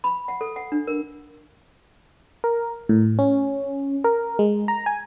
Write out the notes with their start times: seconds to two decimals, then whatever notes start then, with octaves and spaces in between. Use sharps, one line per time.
0.04 B5
0.28 F#5
0.41 A4
0.56 F#5
0.72 D4
0.87 A#4
2.44 A#4
2.89 A2
3.19 C#4
4.04 A#4
4.39 G#3
4.68 A#5
4.86 G#5